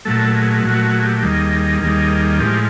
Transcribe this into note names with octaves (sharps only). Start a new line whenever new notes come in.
A#2 F#3 A3 A4
G#4
A#2 F#3 A3 F#4
F#4
G#4
G4
G4
D#2 D#3 G3 A#3 G#4
D#2 D#3 G3 A#3 G#4
A2 F3 G#3 G4